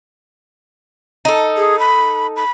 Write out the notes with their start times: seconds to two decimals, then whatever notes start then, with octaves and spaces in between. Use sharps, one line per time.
1.25 D#4 A4
1.57 G#4
1.79 B5
2.36 B5